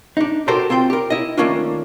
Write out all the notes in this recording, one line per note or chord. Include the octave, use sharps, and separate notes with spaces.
D4 D#4
F#4 G4 A4 A#4 C5
C4 F4 C5 G5
G4 A#4
E4 D#5
D#3 A3 A#3 C#4 D4 F4